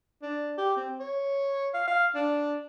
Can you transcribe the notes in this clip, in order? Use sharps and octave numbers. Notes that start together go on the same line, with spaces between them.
D4
G4
C4
C#5
F5
F5
D4